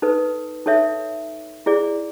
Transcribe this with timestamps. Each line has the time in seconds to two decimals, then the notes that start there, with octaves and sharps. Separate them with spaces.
0.02 D#4 A4 B4
0.66 D#4 A4 C#5 E5
1.66 E4 G#4 D5